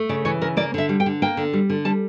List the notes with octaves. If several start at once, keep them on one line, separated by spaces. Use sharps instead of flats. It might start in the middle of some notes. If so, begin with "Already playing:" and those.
Already playing: A3
C#3 D5
E3 C#5
C#3 A#4
A#3 D5
D3 E5
G3
G5
D3
A#3 G5
D3
G3
D3
G3 A5